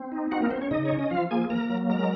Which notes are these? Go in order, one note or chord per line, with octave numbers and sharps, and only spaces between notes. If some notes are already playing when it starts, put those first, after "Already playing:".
Already playing: C4
D#4
C4 F#4 F#5
A#3 A#4
C4 C5
C#4 C#5
C#3 D#4 D#5
C#4 C#5
D#5
F3 F4 F5
A#3 G#4 G#5
A#3 A#4 A#5
F#3
G#3 A#4 A#5